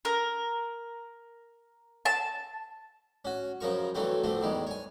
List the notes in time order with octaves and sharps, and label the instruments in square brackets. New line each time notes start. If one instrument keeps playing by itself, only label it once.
[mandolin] A#4
A5
[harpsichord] C#4 F#4
F#2 C#3 F3 A#4 C#6
G2 E3 F#3 A3 C4
D3 F3 A3 C4
E2 D#3 G3 G#3
C#5 G#5